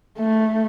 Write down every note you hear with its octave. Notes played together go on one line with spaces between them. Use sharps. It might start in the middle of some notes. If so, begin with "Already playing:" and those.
A3